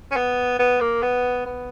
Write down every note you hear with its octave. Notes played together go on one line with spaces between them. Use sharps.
C#4
B3
B3
A#3
B3
B3